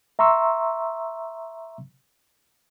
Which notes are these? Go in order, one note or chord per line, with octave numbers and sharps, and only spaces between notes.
E5 A#5 C6 C#6 E6